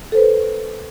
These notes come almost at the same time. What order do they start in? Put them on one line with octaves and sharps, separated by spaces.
A4 C5 B4